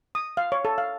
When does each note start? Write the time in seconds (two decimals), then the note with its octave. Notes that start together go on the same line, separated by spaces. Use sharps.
0.15 D#6
0.37 F5
0.52 C#5
0.65 A4
0.78 F5